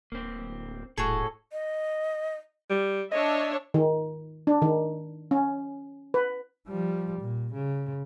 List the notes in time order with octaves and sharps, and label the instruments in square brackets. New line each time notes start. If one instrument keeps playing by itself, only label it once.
[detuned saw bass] D1 [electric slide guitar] A#3 C4
[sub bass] D#1 [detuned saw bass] A2 [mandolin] F#4 G#4 [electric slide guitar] A4
[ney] D#5
[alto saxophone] G3
[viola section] D4 C#5 E5 [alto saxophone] D#5
[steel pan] D#3
D4
D#3
C#4
B4
[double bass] F3 G3
A#2
C#3